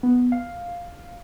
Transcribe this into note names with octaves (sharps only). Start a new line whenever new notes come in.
B3
F5